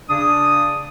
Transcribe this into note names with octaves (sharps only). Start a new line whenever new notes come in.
C#3 D4 D5 D#6